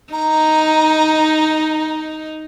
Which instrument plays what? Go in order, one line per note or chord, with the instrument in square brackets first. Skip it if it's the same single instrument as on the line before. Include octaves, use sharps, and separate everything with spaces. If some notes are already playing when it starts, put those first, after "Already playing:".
[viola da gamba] D#4 [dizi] A#5